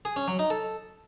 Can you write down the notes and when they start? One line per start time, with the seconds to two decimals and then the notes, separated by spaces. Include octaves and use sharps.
0.05 G#4
0.16 C#4
0.28 F#3
0.39 D#4
0.50 A4